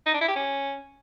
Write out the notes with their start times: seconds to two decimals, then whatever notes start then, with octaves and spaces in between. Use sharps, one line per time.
0.06 D#4
0.14 D4
0.21 E4
0.28 G4
0.36 C#4